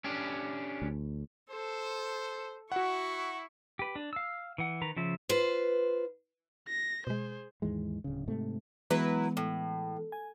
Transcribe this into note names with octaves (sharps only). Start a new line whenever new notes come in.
C#4 D4 G4
D2
A4 C5
E4 F#4 F#5 C#6
G4 B4
D4
F5 E6
E3 F#5
D#3 B4 A#5
C#3 F3 E5
F4 B4 C5
A#6
B2 G#3 G#4 C5
D#2 G#2 E3 G#3
D1 C#3
G#2 C3 A3
E3 F#3 G#3 B3 E4 B4
A2
G#5